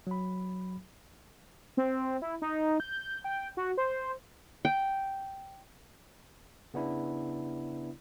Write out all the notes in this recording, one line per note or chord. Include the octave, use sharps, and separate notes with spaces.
F#3 B5
C4
E4
D#4
G6
G5
F#4
C5
G5
C#3 B3 D4 E4